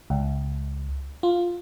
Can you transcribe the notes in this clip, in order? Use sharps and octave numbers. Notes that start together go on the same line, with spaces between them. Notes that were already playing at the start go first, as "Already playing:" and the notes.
C#2
F4